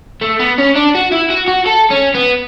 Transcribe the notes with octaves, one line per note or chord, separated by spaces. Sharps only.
A3
B3
C#4
D4
F#4
E4
F#4
F#4
A4
C#4
B3